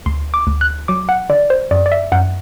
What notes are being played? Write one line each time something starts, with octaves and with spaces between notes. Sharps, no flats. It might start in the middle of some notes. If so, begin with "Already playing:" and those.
D2 C6
D6
D2
F#6
F#3 D6
F#5
D3 D5
C5
F#2 D5
D5
E5
F#2 F#5